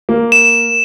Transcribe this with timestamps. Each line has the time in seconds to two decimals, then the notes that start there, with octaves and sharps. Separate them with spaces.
0.09 A#3
0.32 E7